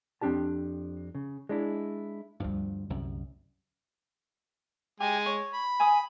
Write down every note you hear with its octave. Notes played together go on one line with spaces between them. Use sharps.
F2 C4 D4 G4 A5
C#3
G#3 D4 E4
D2 G2 F3 G3
C2 F#2
G#3 G4 G#5
C#5
B5
G#5 D#6